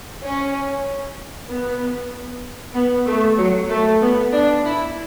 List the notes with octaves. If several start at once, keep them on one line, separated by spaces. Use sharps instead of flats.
C#4
B3
B3
A3
F#3
A3
B3
D4
E4